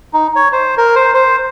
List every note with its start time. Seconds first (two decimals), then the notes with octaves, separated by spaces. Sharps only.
0.13 D#4
0.36 C#5
0.52 C5
0.77 A#4
0.96 C5
1.14 C5